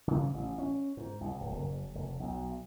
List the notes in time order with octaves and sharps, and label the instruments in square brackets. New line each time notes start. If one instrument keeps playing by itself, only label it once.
[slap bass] C#3
A1
C#4
G#2
C2
D1
F#1
F1
B1